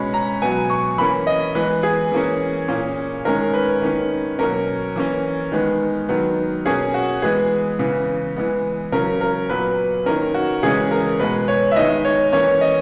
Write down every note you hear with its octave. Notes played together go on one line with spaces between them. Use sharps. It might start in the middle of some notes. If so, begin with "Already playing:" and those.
Already playing: B2 G#3 C#4 B5
A#5
B2 F#3 B3 G#5
C#6
E3 A#3 C#4 B5
D#5
E3 G#3 B3 B4
G#4
E3 A#3 C#4
A#2 A#3 C#4
D#3 G#3 C#4 A#4
B4
D#3 A#3 C#4
B2 F#3 A#3 C#4 A#4
E3 A#3 C#4
D#3 G#3 B3
D#3 F#3 B3
B2 A#3 C#4 G#4
F#4
E3 G#3 B3 G#4
C#3 E3 B3
E3 G#3 B3
C#3 F#3 C#4 A#4
A#4
A#2 F#3 B3 B4
D#3 A#3 C#4 A#4
F#4
C#3 E3 G#3 C#4 G#4
A#4
B2 G#3 B3 B4
C#5
E5
D#3 G#3 B3 D#5
C#5
E3 A#3 C#4 C#5
D#5